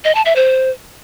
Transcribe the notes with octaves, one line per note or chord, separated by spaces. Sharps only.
D#5
A5
E5
C5